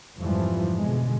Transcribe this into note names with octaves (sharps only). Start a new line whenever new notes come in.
F2 G#2 D3 E3 F3 G3
B2 D3 G#3